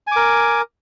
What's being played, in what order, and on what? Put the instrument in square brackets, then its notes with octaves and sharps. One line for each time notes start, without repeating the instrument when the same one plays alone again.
[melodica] G#5
D6
A#4